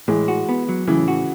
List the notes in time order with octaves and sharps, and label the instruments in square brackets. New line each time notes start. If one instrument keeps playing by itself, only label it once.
[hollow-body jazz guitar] A2 [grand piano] E3 G#3
[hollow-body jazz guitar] F#4
B3
F#3
[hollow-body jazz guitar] A2 [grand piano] C#3 E3
[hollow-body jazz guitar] F#4